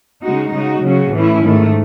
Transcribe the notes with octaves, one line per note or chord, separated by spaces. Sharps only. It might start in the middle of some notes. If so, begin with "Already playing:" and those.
C#3 G#3 D#4 F#4
C#3 G#3 D#4 F#4
C#3 F#3 C#4 F#4
A2 E3 A3 C#4 E4
G#2 D#3 A3